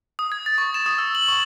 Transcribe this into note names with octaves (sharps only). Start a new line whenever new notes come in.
D#6
G#6
A6
C#6
E7
D#6
E6
F#7
C#6